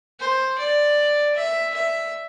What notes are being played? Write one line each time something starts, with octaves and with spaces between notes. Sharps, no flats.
C5
D5
E5
E5